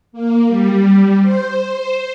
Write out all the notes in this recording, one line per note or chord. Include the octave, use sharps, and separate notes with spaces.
A#3
G3
C5